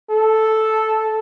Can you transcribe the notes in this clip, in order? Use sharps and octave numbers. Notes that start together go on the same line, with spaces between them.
A4